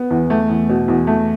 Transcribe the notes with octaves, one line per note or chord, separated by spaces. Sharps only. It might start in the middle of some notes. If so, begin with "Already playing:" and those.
Already playing: B3
E2
A3
E2
B2
E2
A3